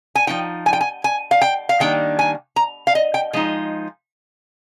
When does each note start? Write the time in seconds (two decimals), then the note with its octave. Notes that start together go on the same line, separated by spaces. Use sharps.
0.15 G#5
0.27 F3 A#3 D#4 G5
0.66 G#5
0.73 G5
0.81 G#5
1.04 G#5
1.31 F5
1.41 G5
1.69 F5
1.80 D#3 G3 A#3 D4 G5
2.19 G#5
2.56 A#5
2.87 F5
2.95 D#5
3.14 G5
3.33 F3 G#3 D#4